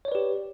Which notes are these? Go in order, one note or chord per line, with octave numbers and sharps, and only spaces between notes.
G4 B4 C#5 D5